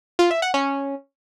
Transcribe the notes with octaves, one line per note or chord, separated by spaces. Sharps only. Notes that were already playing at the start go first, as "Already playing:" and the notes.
F4
E5
F#5
C#4